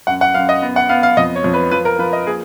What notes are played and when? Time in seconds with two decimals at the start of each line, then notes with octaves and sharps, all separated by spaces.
0.07 F#2 F#5
0.21 F#5
0.34 F#2 F5
0.49 D#5
0.62 B3
0.76 F#5
0.89 B3 F5
1.03 F5
1.17 F2 D#5
1.36 C#5
1.44 F2
1.54 B4
1.71 F3 B4
1.85 A#4
1.99 F3 B4
2.13 D#5
2.27 A#3 G#4